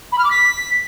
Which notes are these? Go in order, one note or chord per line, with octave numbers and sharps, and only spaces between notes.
B5
F6
D6
B6